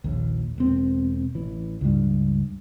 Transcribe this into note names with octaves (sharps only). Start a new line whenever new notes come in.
A#1 D#2
E1 C4
A1 E3
C#2 G2